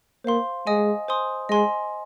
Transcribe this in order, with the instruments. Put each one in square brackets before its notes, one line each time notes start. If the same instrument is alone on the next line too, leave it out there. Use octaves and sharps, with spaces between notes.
[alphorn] A#3 [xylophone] C5 F5 C6
[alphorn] G#3 [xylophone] D#5 G#5 D#6
[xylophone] C5 G#5 C6 D#6
[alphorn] G#3 [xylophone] D#5 G#5 C6